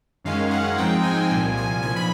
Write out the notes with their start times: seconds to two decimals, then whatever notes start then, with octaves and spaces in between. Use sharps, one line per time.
0.25 F#2 D#3 G#3 C#4 F5
0.51 F#5
0.78 G#2 F3 G#3 C4 D#4 G5
1.03 G#5
1.30 C2 A#2 F3 G#5
1.57 G#5
1.82 B1 A#2 F3 G#5
1.96 B5